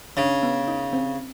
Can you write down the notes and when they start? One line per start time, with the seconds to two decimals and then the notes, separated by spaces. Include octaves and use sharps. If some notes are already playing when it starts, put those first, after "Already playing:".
0.17 C#3 D4
0.43 B3
0.68 D#4
0.93 C4